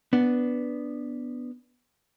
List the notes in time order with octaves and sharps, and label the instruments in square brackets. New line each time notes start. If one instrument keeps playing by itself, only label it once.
[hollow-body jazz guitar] B3 D4